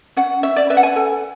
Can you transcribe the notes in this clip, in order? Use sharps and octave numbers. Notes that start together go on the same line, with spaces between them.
C#4 F#5
C#4 E5
D5
B4 E5
F#5
G#5
A4